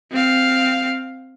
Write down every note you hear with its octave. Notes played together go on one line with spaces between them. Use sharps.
C4 F5